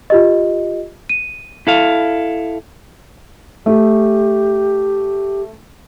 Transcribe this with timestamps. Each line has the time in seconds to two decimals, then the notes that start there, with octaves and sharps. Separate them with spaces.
0.10 F4 G4 D#5
1.09 D#7
1.67 E4 A4 F5
3.66 A3 G4